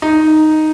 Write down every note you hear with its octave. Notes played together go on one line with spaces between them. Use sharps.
D#4